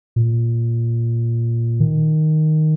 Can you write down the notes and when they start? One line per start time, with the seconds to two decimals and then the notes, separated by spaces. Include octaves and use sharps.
0.16 A#2
1.80 D#3